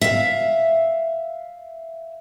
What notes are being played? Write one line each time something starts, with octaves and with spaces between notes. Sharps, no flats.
E5 F5